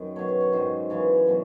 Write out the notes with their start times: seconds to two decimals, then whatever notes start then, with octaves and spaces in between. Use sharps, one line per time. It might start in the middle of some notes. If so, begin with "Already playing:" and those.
Already playing: F#2 D#3
0.16 B2 F#3 C#5
0.28 C#5
0.41 C#5
0.52 G#2 D#3 F#3 C5
0.90 F#2 C#3 E3 C#5
1.27 B2 F#3